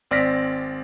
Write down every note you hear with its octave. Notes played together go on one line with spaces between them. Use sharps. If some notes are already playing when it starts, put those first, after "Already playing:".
G#1 C4 D5 F6 A#6 B6